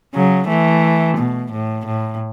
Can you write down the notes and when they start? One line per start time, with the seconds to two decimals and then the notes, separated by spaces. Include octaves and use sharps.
0.14 C#3 F#3
0.48 E3 A3
1.17 B2
1.52 A2
1.86 A2